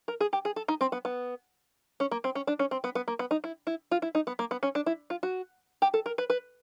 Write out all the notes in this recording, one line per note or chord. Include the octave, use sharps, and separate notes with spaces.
A#4
G#4
G4
G#4
A4
D#4
C4
B3
B3
C#4
A#3
C4
C#4
D4
C#4
C4
B3
B3
A#3
B3
D#4
E4
E4
F4
E4
D#4
B3
A#3
B3
C#4
D4
E4
F4
F#4
G4
A4
A#4
B4
B4